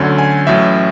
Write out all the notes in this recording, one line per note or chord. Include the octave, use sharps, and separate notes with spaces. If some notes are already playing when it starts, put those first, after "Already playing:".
Already playing: D2 D3 F#3 C#4
G#5
A1 A2 F#3 C#4 E5